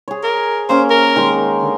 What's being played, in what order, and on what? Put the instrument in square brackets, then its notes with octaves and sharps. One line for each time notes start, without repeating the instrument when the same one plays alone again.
[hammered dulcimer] G#4 C#5
[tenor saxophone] A#4
[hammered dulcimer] A#3 C#4 [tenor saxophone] C5
[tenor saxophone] A#4
[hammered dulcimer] D#3 G#3 D#4
[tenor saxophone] D3